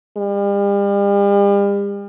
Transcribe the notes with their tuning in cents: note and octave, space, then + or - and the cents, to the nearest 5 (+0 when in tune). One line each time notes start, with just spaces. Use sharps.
G3 +40